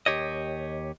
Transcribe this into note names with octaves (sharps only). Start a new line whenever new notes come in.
D#2 G4 C#5 D#5